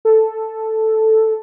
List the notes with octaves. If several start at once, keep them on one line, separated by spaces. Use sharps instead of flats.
A4